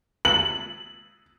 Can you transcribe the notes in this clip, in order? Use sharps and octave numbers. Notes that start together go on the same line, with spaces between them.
F#7